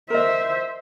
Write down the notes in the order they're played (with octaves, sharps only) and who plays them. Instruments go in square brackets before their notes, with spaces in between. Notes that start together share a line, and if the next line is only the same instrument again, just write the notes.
[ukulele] A#4 D#5 [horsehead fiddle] C5 E5